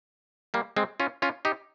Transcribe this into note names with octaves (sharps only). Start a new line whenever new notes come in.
G3 A#3
G#3 C4
C#4 F4
C#4 F4
D#4 G4